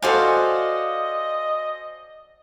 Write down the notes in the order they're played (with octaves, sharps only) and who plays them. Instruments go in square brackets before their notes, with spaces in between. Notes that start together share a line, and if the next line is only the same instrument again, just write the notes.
[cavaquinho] F#4 D5 F5 [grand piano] A4 C5 G#5 [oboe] D#5